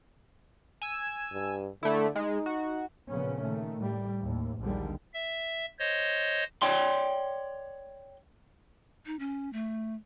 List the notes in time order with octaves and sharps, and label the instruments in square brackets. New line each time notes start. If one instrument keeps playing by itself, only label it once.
[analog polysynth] G#5 E6
[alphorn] G2
[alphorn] D3 [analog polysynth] A3 E4
[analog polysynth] G#3 [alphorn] D#4
[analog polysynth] F#4
[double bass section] A#2 C#3 F3 B3 C#4
D#3 A3
A2 G3
D#2 A2
A#1 D#2 D3 G3 G#3
[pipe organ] E5
C5 C#5 D#5
[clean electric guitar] C#5 D5 G5 C6
[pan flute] D#4
C#4
A3